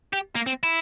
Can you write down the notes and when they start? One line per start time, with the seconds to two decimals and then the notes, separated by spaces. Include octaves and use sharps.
0.13 G4
0.35 A#3
0.47 C4
0.63 E4